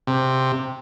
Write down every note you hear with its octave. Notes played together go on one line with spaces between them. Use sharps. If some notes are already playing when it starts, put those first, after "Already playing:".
C3